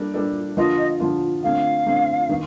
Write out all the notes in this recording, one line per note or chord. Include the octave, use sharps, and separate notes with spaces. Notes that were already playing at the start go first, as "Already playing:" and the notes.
Already playing: G3 A#3 D4 A4
G3 A#3 D4 A4
D3 F3 A#3 F4 D#5
D3 F3 A#3 F4
D3 A3 C4 F5
D3 A3 C4
D#3 A#3